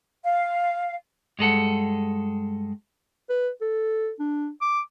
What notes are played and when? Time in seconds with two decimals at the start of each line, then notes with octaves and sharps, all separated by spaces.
0.24 F5
1.39 G2 G#3 A4 F#5
3.29 B4
3.61 A4
4.19 D4
4.61 D6